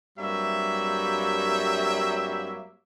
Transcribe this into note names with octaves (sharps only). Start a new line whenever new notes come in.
G2 F#3 G3 A#3 C4 E5